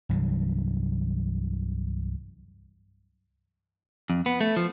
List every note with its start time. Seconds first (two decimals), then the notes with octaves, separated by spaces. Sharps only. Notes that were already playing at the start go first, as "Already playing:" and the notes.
0.09 C2 G2 E3 F#3
4.10 F2
4.26 B3
4.41 A3
4.57 F3